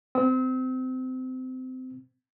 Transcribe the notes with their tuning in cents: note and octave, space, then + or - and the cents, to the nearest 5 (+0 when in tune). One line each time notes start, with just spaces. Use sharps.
C4 -25 E6 -40